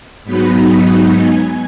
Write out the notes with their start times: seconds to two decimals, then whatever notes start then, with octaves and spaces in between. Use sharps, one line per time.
0.24 G#2 F#3 B3 D#4 B5
1.17 G#5